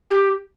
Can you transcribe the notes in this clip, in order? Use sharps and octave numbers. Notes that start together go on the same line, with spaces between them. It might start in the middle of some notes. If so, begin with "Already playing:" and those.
G4